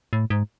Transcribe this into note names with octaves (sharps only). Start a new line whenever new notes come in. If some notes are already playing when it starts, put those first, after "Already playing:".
A2
G#2